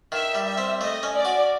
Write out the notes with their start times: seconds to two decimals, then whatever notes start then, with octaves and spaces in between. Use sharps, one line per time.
0.12 D#3 E5
0.35 G3
0.47 E5
0.58 C4
0.81 A3 D#5
1.03 C#4
1.15 D5
1.25 F#4